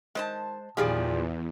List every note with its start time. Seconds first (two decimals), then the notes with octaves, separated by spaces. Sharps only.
0.15 D#3 G#3 C5 A5
0.77 E2 A#2 D#3 F3 G3 G4 G#4 F5